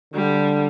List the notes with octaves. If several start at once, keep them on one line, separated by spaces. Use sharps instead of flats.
D3 G3